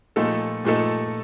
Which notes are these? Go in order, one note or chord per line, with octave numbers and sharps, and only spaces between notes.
A#2 F3 A3 D#4 A4
A#2 F3 A3 D#4 A4